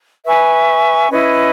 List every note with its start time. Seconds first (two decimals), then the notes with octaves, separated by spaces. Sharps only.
0.25 B4 E5 G#5 C#6
1.10 C#4 E4 B4 D#5